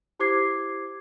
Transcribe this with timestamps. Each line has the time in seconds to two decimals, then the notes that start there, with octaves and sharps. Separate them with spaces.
0.20 E4 G4 C5 D6 G#6 C7